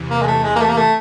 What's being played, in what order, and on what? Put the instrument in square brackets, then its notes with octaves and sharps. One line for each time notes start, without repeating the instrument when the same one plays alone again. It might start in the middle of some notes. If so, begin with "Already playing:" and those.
Already playing: [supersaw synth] E2 C3 E3
[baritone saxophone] A#3
G#3
A3
G#3
A#3
A3
A#3
A3